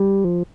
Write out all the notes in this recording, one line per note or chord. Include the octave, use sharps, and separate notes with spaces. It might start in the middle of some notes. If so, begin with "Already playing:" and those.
Already playing: G3
F3